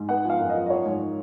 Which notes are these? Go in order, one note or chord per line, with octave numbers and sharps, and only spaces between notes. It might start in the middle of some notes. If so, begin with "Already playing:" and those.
Already playing: G#2
B3 F#5
F3 F5
F#2
D#5
F3
D#5
F3 C#5
G#2